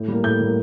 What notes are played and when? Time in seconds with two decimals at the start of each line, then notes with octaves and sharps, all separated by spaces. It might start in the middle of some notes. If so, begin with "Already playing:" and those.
Already playing: A2 G6
0.08 G3 A#3
0.24 A2 G6
0.40 G3 A#3